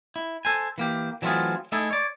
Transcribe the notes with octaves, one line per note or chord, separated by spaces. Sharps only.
E4
A4 C5 G#5
E3 A#3 G4
E3 F#3 A3 C4 F4 G#4
A3 D#4 E4 G#4 A4
C#5 D5